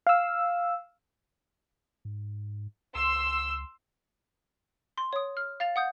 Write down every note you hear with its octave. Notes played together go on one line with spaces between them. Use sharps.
F5 E6
G#2
C#2 C6 E6
C6
C#5 D#6
F6
F5 A6 F7
F#5 D#6 G6